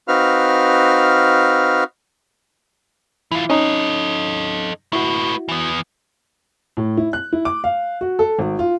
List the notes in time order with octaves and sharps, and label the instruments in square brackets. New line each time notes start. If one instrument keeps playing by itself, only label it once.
[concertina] C4 D#4 F#4 B4 F5 F6
[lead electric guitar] E3 F4 [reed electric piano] E4
[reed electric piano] C#4 D#4 C#5 [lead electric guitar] A4 D#5
[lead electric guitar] A3 B4 [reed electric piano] E4 F#4
[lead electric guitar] E3 B3
[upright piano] A2
E4
F#6
E4
D6
F5
F#4
A4
G#1
F4